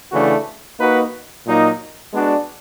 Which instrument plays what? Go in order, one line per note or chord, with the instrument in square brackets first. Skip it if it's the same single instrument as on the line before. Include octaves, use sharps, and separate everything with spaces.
[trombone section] C#3 E3 A3 D4 F#4
A#3 D#4 F#4 B4
A#2 F#3 A#3 D#4
G#3 B3 D4 F#4